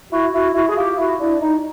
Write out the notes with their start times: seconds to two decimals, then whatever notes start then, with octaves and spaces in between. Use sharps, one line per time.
0.11 E4 F#4
0.33 E4 F#4
0.54 E4 F#4
0.68 G#4
0.76 F4 G4
0.97 E4 F#4
1.20 D4 E4
1.41 D#4